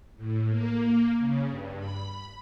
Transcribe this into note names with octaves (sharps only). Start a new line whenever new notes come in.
A2
A#3
C#3
G2
B5